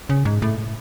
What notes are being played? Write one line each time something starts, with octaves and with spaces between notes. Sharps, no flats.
C#3
G#2
A2